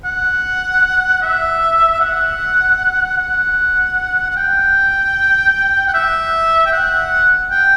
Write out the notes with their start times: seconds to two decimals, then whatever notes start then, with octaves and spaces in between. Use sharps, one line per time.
0.05 F#5
1.22 E5
2.00 F#5
3.18 F#5
4.30 F#5
4.36 G5
5.88 F#5
5.94 E5
6.66 G5
6.73 F#5
7.51 G5